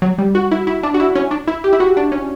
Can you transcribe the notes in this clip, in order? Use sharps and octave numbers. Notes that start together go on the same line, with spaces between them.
F#3
G3
F#4
E4
E4
D4
F#4
E4
C#4
D4
E4
G4
E4
F#4
D4
C#4